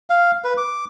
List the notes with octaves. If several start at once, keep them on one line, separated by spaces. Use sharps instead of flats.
F5
B4
D6